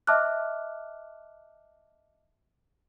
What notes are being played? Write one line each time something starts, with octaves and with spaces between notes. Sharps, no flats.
D#5 E5 A5 D6 F6 F#6